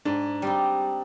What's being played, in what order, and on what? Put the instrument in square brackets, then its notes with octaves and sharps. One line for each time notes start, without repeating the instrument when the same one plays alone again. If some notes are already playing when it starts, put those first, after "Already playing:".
[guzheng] G#2 [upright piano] D4
[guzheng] G3 C4 D#4